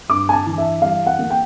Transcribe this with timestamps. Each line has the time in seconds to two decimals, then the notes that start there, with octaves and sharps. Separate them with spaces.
0.09 G2 D6
0.29 G#5
0.33 A5
0.46 E3
0.58 E5
0.82 G3 F5
1.07 F#5
1.19 A#3
1.30 G5